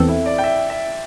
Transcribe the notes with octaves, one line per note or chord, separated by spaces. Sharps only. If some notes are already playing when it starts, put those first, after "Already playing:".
Already playing: E2 E3 C4 A4
E4
D5
G5
E5
E5